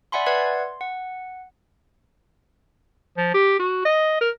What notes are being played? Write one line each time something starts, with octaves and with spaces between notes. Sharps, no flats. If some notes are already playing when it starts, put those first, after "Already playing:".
D5 E5 F#5 G#5 B5 C6
B4 D5 E5 F#5 G#6 C7
C6
F#5
F3
G4
F#4
D#5
A#4